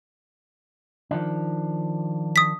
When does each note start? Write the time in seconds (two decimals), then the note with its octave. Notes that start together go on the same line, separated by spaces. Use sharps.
1.11 D#3 F3 D4
2.36 D#6 B6